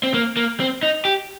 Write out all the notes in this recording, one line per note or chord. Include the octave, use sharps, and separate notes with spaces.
C4
A#3
A#3
C4
D#4
G4